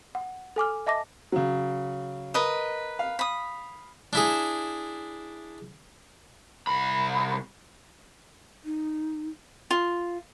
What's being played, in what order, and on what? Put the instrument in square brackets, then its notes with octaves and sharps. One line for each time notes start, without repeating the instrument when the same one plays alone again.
[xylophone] F#5
A4 G#5 D6 F6
D#5 E5 A5 D6 A#6
[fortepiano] C#3 F#3
[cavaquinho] A#4 B4 D#5
[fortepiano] F5
[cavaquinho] B5 D#6
[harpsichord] D4 E4 G#4
[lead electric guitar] C2 B5
[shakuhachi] D#4
[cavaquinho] F4